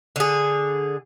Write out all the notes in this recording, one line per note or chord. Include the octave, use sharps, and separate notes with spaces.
D3 G#4